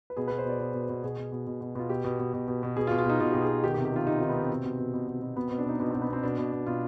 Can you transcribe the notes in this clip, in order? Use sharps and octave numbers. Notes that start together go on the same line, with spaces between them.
B4
B2 G#4
B2 B4
C5
B2 D5
B2 C5
B2
B4
B2
B2 G#4
B2
B2
B2
B2
B2 F4
B2 G4
B2
B2
B2
B2
B2
B2 G#4
F4
B2
F4
B2 D#4
B2 F4
B2 G4
G#4
B2
D#3 G4
G4
C3
G4
D#3 F4
C3 D#4
D#3 C4
B3
C3 C4
B2
B2
B2
B2
B2
B2
B2 B3
B2 C4
D4
B2 D#4
B2 D4
B2 C4
B3
B2 C4
B2 D4
B2
B2
B2 F4